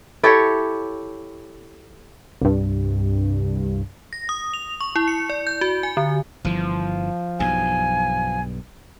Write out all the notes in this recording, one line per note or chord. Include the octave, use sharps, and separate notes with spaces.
E4 G4 A4 C#5
C2 G2
A#6
D#6
F7
C#6
E4
C#7
D5
G6
F#4
G#5
D3
G1 E3 F3
B1 G2 G#5